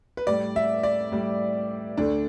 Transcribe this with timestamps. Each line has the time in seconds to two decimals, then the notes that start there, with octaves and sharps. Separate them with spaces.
0.17 B4
0.27 A2 G3 D5
0.56 E5
0.83 D5
1.12 A2 G3
1.97 D2 D3 A3 D4